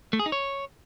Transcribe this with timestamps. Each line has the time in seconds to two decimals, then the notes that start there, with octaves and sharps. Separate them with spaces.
0.13 A3
0.19 G#4
0.26 D#4
0.32 C#5